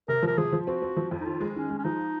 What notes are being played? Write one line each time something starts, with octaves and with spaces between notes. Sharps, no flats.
C3 A#4
F3 A#4
F3 G#4
F3
C4 F#4
C4
F3
F2
D#4
D#3 F4
G#3
D#3 C#4
G#3
C#4
F3 D#4